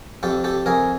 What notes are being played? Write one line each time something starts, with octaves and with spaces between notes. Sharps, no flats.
F2 G4 A4
G4 A4
F2 G#4 A#4